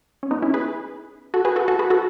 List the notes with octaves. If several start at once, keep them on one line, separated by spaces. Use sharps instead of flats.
C#4
B3 D#4
C#4 E4
G#4 B4
F#4 A4
G#4 B4
F#4 A4
F#4 A4
G#4 B4
F#4 A4